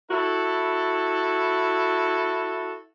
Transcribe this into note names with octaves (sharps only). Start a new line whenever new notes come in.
E4 F#4 A4